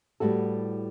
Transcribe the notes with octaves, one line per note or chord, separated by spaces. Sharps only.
A2 G3 B3 F#4 A4